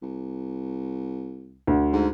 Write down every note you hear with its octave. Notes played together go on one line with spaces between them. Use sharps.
C2
D2
G#2